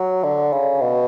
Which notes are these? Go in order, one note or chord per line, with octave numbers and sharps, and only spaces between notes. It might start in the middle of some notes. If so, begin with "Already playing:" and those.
Already playing: F#3
D3
C#3
B2